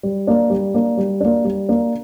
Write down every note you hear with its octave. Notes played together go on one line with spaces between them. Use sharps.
G3
A#3 D4
G3
A#3 D4
G3
A#3 D4
G3
A#3 D4